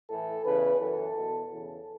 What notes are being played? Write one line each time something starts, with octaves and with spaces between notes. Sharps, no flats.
A2 E3 A4
E2 C#3 E3 B4
F#2 E3 A4
E2 B2
E2 C#3 E3 A4